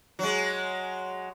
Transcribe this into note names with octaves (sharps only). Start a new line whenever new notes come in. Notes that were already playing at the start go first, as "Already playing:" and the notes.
F#3 G#3